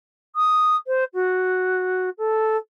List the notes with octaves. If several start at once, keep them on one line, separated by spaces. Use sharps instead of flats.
D#6
C5
F#4
A4